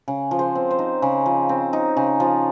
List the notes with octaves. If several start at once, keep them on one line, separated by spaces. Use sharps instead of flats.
C#3
F3
C5
C4
C5
D#4
C#3
F3
C4
D#4
C#3
F3